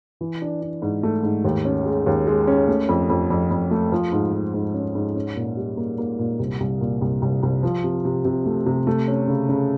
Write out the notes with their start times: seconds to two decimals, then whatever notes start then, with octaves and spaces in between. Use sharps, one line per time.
0.21 E3
0.42 D4
0.62 D4
0.82 G#2
1.03 A3
1.23 G#2
1.45 D#2
1.65 C#4
1.86 G#3
2.06 D#2
2.27 G#3
2.48 C#4
2.68 A3
2.89 F2
3.10 F2
3.30 F2
3.51 F2
3.71 A3
3.92 F3
4.12 G#2
4.33 F3
4.54 G#2
4.74 C#4
4.95 G#2
5.16 C#4
5.36 A#2
5.57 G3
5.77 A#3
5.98 A#3
6.19 A#2
6.39 C2
6.60 C2
6.81 A#2
7.01 C2
7.22 C2
7.43 C2
7.63 F3
7.84 C3
8.05 C3
8.25 C3
8.46 A3
8.66 C3
8.87 A3
9.08 C#4
9.28 C#3
9.49 C#3